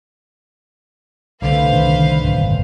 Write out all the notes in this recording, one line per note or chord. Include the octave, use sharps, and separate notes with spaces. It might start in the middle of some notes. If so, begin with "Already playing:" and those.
C2 D3 A3 B4 C5 F5
D#3 D4
D#1 G#1 F#2